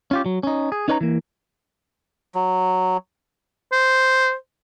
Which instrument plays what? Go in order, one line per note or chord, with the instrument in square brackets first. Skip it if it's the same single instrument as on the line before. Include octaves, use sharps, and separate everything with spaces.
[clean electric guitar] C#4 F4 G4
F#3
C#4 D#4
G#4
C#4 D#4 B4 C#5 G5 A#5
E3 A#3
[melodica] F#3
[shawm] C5